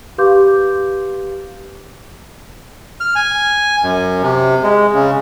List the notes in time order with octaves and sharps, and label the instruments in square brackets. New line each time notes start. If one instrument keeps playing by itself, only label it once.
[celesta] G4 B4 F5 C6 D6 G6
[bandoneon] F6
G#5
F#2
C3
G#3
C#3